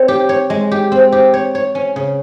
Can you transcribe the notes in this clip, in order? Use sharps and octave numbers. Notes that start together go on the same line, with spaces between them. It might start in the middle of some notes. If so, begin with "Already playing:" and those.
Already playing: C4 C#5
G4
C#5
G#3
G4
C4
G4
C#5
C#5
C#4
C#3